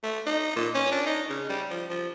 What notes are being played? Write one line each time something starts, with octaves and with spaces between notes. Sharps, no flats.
A3
D#4
A#2
C#4
D4
D#4
C#3
G3
F3
F3